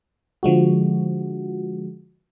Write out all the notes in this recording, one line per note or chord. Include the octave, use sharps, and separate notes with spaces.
D3 F3 G#3 F#4